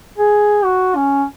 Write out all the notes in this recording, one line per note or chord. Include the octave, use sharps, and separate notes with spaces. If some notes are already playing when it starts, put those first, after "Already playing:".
G#4
F#4
C#4